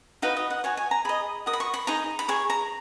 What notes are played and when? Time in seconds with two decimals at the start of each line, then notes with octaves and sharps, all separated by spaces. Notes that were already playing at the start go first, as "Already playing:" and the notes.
0.22 D#4 F#4 B4 D#5 F5
0.37 D#5
0.50 F#5
0.64 F#4 C#5 G#5
0.77 G#5
0.91 A#5
1.05 G#4 D#5 B5
1.46 F#4 A#4 D#6
1.53 B5
1.60 C#6
1.74 B5
1.87 D#4 G#4 D#5 A#5
2.19 B5
2.28 G#4 C#5 C#6
2.50 A#5